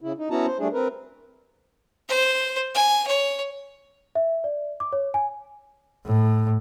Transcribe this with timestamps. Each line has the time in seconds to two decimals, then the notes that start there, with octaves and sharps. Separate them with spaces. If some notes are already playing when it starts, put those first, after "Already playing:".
0.01 C#3 E4
0.18 D#4
0.30 B3 C#4 E4 F#4 A5 A#5
0.46 C5
0.59 G3 A3 D4 G#4
0.73 C4 A#4 B4
2.09 C5
2.75 G#5
3.07 C#5
4.15 E5
4.44 D5
4.80 D6
4.93 C#5
5.14 G#5
6.06 A2